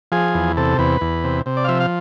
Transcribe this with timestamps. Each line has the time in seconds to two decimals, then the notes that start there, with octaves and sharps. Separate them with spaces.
0.12 F3 G#4
0.34 E2
0.57 C3 A4
0.79 E2 B4
1.01 E2
1.24 C3
1.46 C3
1.57 D5
1.64 F5
1.68 F3 E5
1.80 F5